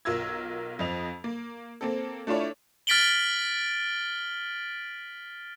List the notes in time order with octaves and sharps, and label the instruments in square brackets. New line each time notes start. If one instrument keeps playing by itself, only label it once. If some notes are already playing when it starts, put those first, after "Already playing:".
[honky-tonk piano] B1 F4 A#4 E6 G#6
F2 F3 D#5 F7
A#3
A#3 C4 A4
A3 D4 E4 F4 C#5 D5
[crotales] F6 A6 B6 D7 F#7 G7